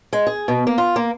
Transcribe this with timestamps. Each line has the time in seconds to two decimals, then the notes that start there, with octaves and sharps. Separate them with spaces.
0.13 G#3
0.27 G#4
0.48 B2
0.67 A#3
0.78 F4
0.96 A#3